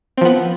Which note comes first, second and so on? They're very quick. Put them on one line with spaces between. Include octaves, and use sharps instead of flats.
C4 F3 B3